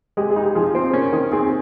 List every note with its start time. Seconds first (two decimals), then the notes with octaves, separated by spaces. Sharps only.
0.17 G#3 G4
0.30 G#4
0.36 D#4
0.43 G4
0.55 F3 G#4
0.75 C4 C5
0.93 C#4 A#4
1.13 D#3
1.32 C4 G#4